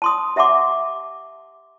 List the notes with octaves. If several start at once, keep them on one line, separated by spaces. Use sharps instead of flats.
A5 C6 D#6
G4 E5 F#5 A5 C6 D6